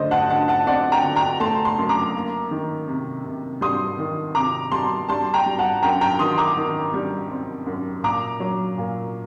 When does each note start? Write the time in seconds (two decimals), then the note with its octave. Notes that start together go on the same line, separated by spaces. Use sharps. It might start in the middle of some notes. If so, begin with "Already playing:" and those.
Already playing: F#2 D3 A3 C5 D5 D#5
0.11 F#5 A5
0.30 D3 F#5 A5
0.48 F#5 A5
0.67 C4 D5 F#5
0.92 G5 A#5
1.04 D3
1.16 G5 A#5
1.40 A3 A5 C6
1.65 A5 C6
1.78 F#2
1.89 A#5 D6
2.15 A#3
2.51 D#3
2.88 C3
3.24 C3
3.61 G3 C6 D#6
3.99 D#3
4.35 C3 A#5 D6
4.72 G3 A5 C6
5.09 G3 A5 C6
5.34 G5 A#5
5.46 G3
5.59 F#5 A5
5.83 F#2 G5 A#5
6.01 G5 A#5
6.19 D#3 C6 D#6
6.38 A#5 D6
6.57 D#3
6.94 G3
7.31 C4
7.66 F#2
8.03 A#2 A#5 D6
8.40 F#3
8.78 A#2